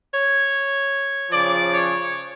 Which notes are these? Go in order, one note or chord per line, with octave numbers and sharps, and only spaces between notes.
C#5
C#3 F3 D5
C#5